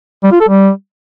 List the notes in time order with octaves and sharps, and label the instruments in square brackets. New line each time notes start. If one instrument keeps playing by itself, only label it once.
[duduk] G3
F4
A4
G3